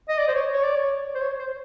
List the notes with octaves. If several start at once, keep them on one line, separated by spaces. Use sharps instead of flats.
D#5
D5
C5
C#5
C#5
D5
C#5
C5
C#5
C5